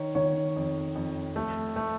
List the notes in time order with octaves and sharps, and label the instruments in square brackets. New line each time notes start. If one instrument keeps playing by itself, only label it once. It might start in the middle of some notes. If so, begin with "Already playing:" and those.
Already playing: [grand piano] D#3 [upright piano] C#5
[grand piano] D#3 [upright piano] C#5
[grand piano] F2
F2
A3
A3